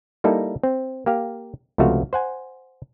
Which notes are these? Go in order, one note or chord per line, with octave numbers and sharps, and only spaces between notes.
G3 A#3 D#4 E4 A4
C4
A#3 G4 F5
C#2 C3 F3 A3 F#4 F5
C5 F#5 G#5